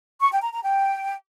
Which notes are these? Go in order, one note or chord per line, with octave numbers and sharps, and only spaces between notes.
C#6
G5
A#5
A#5
G5